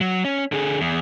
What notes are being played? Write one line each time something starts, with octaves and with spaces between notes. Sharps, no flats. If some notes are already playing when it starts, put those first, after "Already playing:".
F#3
C#4
D3 G#4
E2